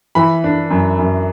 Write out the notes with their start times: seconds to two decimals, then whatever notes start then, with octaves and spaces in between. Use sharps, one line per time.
0.15 E3 B5
0.44 D4
0.70 F#2
0.99 F#2